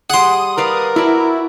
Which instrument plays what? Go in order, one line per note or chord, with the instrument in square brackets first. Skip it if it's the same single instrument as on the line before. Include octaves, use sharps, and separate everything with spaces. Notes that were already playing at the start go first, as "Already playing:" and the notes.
[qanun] G3 G#4 [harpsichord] F#5 C6 [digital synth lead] D#6
[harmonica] A#4 [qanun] B4 D5 F5
[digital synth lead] E4 [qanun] F#4 D5 A5